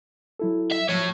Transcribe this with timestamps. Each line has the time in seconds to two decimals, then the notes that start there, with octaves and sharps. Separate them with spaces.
0.39 F#3 E4 A4
0.71 E5
0.89 F3 F#3 A3 C#5